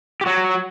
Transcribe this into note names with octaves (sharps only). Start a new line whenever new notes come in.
G4
F#3 F#4